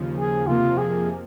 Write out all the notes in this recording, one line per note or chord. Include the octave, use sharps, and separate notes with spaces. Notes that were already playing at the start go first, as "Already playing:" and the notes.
Already playing: D#2 C#3 F3
G#4
F2 C3 F3 A#3 F4
G#4